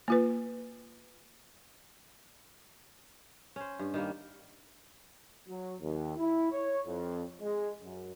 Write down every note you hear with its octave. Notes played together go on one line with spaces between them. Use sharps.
A#3 F4 B4
C#4 C5
G2
D#3 G3 A#3
F#3
D#2
E4
C#5
F2
G#3
F#2